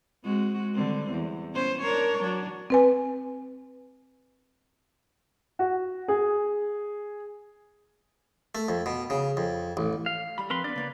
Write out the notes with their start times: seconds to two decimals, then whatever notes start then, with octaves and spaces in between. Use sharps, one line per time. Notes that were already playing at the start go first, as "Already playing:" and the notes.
0.24 G#3 C4 F#4
0.74 D3 G3 C4
1.10 E2
1.52 B3 C#4 C5
1.82 D4 A#4 C#5
2.19 F#3 D4
2.70 C4 B4 G#5
5.59 F#4
6.08 G#4
8.55 A3
8.69 F2
8.86 B2
9.10 C#3
9.37 F2
9.77 A1
10.06 F5
10.38 G3 B5
10.50 F3 C4 A#4 B4 C6
10.64 B3 D4 B4 D5
10.76 C#3 A#3 B3